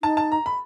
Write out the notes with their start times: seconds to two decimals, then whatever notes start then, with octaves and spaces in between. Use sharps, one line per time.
0.03 D#4 A5
0.17 A5
0.32 A#5
0.46 B5